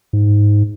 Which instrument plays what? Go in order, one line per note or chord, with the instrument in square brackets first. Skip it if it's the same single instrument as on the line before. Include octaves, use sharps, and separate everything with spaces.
[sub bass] G#2